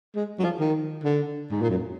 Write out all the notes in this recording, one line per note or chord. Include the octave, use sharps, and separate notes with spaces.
G#3
F#3
F3
D#3
D3
G#2
A#2
F#2